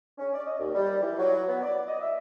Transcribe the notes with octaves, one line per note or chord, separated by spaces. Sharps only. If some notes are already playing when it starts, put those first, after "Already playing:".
C#4
D5
D#5
D#2
G3
E3
F#3
B3
D5
D#5
E5